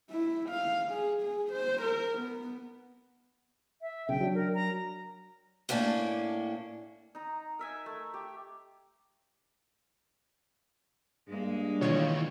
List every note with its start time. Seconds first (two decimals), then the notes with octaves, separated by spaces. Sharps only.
0.11 E4
0.49 F5
0.92 G#4
1.22 G#4
1.52 C5
1.82 A#4
2.19 B3
3.82 E5
4.09 B1 C#3 G5
4.21 F#3 D4
4.35 A#4
4.55 A#5
5.69 A2 A#3 C#4 D4
7.15 D#4 A#5
7.59 A#4 E5 G#5
7.86 A3
8.14 G4
11.28 G2 G#3 A#3
11.81 B2 D#3 E3 F4 C#5